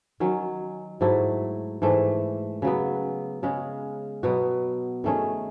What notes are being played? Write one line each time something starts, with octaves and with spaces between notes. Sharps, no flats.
D#3 F#3 C#4
G#2 F#3 A3 E4
G#2 E3 A3
C#3 F#3 B3
C#3 G#3 C#4
B2 F#3 B3 F#4
D#3 A3 C#4 G#4